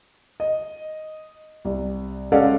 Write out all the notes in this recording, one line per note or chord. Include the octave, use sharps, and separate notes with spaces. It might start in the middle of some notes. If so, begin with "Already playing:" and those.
D#5
C2
G#3 C#4 A4 D5 F5 F#5